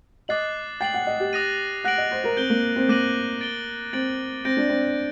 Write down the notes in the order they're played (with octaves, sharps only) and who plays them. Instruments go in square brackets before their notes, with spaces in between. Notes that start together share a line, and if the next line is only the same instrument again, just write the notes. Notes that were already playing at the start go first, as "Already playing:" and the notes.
[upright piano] D#5 [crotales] D6 F#6 A6 C7 F#7
[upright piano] G5 [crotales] A6 C7 F#7
[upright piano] F#5
D#5
G4
[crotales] D#6 F#6 A#6 D#7
[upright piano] F#5 [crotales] F#6 A#6 D7 F#7
[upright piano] D#5
C5
A#4
[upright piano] C4 [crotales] G6 D7 G7
[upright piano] A#3
C4
[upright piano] A#3 [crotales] D6 F#6 A#6 D#7 F#7
[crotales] A6 D7 G7
[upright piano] C4 [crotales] A6 D7 F#7
[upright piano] C4 [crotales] G6 A#6 D7
[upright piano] D4
C4